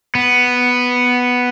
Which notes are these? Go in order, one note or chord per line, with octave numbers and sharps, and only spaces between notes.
B3